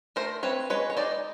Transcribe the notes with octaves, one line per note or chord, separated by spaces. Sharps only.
A3 A#4 C5
C4 B4 C#5
G#3 B4 C#5
C#5
D#4 C5 D5